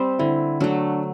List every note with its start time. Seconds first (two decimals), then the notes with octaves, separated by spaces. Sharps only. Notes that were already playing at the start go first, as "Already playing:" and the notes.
Already playing: G3 C4
0.19 D3 E4
0.60 F#3 A3 D4